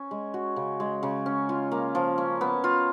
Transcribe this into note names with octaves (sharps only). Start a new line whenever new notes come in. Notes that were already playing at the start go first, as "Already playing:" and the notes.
Already playing: C#4
G#3
F#4
C#3
G#3
C#3
C#4
F4
A#3
F3
C#4
B3
F4